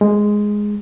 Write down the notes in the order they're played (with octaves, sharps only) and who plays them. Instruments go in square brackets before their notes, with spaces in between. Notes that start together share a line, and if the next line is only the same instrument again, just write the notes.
[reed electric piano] G#3